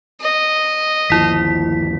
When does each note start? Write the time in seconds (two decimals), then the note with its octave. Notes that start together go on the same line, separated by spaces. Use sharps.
0.21 D#5
1.10 G1 D#2 F3 E4 B6